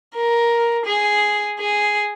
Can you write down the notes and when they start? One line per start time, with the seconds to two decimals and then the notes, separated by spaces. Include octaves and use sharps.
0.16 A#4
0.85 G#4
1.60 G#4